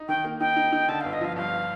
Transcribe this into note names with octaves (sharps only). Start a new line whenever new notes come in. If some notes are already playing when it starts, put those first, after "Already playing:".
Already playing: D#4
D#3 G5
A#3
D#4 G5
D#4
D#4
D3 A5
G1 F5
D#5
F3 F5
G2 F5